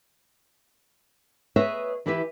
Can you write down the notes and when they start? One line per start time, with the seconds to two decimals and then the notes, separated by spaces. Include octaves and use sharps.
1.56 G#4 B4 C#5 D#5 E5
2.06 E3 E4 G4 B4 E5